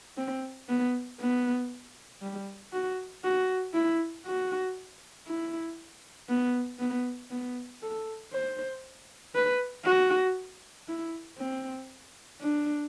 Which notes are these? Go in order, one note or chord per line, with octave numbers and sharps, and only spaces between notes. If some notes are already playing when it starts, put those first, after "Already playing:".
C4
B3
B3
G3
F#4
F#4
E4
F#4
E4
B3
B3
B3
A4
C5
B4
F#4
E4
C4
D4